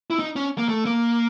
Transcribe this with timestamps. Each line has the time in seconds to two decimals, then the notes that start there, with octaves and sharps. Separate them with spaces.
0.10 E4
0.19 D#4
0.36 C#4
0.58 A#3
0.69 A3
0.85 A#3